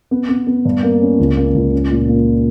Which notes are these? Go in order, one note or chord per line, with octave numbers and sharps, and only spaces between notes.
B3
B3
B3
G2
A#3
C#4
C#2
A#3
C#2
C#4
A#2
A#3